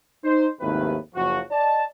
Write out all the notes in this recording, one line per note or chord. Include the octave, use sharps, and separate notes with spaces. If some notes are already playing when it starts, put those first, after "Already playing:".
D#4 C5
G#1 D#2 A2 C3 D#3 B4
F#1 F3 F#4
D5 D#5 A5